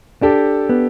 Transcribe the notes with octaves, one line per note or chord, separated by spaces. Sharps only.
D4 G4 A4
B3